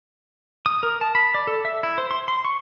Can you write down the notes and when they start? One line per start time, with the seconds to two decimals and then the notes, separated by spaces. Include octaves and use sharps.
0.66 D#6
0.83 A#4
1.01 A5
1.15 B5
1.35 D5
1.47 A4
1.65 E5
1.83 E4
1.98 C5
2.11 C6
2.28 C6
2.45 C#6